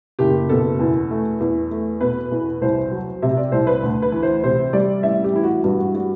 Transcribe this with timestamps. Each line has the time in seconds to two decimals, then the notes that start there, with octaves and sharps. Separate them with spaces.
0.19 F#1 G4
0.49 B2 A4
0.79 E2
1.11 A3
1.40 E2
1.71 A3
2.00 B2 B4
2.31 E2
2.61 C2 C5
2.91 F#3
3.22 C3 E5
3.37 D5
3.52 C2 C5
3.67 B4
3.83 D2
4.02 B4
4.12 E3
4.23 C5
4.43 C3 C5
4.73 G3 D5
5.03 A1 E5
5.24 G4
5.33 E3 E4
5.43 F#4
5.64 G2 F#4
5.79 F#4
5.94 G3 F#4